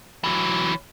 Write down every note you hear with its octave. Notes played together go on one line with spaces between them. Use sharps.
E3 F#3